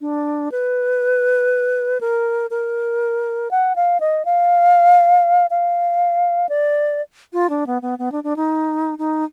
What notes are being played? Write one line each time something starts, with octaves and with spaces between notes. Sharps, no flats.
D4
B4
A#4
A#4
F#5
F5
D#5
F5
F5
D5
F4
D4
B3
B3
B3
D4
D4
D#4
D#4